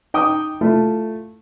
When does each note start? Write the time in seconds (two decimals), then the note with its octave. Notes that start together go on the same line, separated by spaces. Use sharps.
0.14 D#4 G5 D6 D#6
0.61 A3 E4 F4